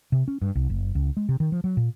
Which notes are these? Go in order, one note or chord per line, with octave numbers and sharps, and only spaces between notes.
C3
C#4
G2
C2
F#1
C#2
G#3
C3
D#3
F3
F#3
A#2